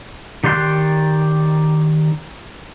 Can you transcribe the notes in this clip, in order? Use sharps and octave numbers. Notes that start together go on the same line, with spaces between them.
D#3 G4 D5 C6 F#6